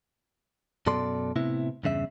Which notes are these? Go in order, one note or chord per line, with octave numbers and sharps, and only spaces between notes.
F#2 B2 A4 D5 C6
A2 C3 B3 E4
E2 G2 C#3 E5